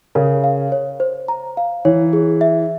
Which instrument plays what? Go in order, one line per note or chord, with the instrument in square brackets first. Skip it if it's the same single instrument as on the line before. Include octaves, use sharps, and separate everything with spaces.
[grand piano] C#3 [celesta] A#4
[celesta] F5
C#5
C5
A#5
F5
[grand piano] E3 [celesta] C#5
[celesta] G#4
E5